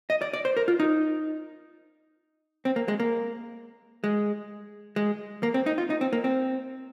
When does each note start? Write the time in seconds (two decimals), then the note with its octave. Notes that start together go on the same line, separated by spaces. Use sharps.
0.10 D#5
0.22 D5
0.33 D5
0.45 C5
0.57 A#4
0.68 F4
0.80 D#4
2.65 C4
2.76 A#3
2.88 G#3
3.00 A#3
4.04 G#3
4.96 G#3
5.43 A#3
5.54 C4
5.66 D#4
5.78 F4
5.90 D#4
6.01 C4
6.13 A#3
6.24 C4